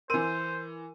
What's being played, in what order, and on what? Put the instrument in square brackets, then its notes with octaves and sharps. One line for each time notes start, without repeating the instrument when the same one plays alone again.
[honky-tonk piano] E3 D#7 [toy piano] A#4 C6 [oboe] C5